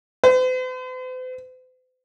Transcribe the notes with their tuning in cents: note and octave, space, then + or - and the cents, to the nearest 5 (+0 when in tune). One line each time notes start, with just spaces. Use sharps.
C5 -45